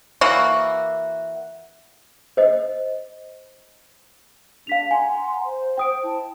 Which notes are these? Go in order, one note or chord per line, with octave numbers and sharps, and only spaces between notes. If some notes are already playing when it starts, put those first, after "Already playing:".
E3 A#3 F#4
C5 D#5
D4 F5 B6 F7
F#5 G#5 A#5 C6
C5
G5 D#6 D7
E4 A5